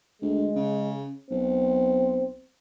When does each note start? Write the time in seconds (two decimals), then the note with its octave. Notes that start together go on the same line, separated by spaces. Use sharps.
0.22 D2 G#3
0.56 C#3
1.31 B1 C4